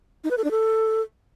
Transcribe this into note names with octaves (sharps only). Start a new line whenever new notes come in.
D#4
B4
A4
D4
A4